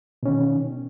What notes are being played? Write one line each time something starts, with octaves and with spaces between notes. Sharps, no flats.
B2 D#3 C#4